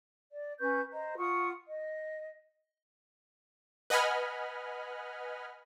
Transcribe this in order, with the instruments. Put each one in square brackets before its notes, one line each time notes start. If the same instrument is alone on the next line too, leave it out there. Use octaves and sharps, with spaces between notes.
[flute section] D5
C#4 B4 C#6 G6
C5 D#5 A#5
F4 F#5 C#6 D#6
D#5
[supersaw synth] B4 D#5 F#5 G#5 B5 F6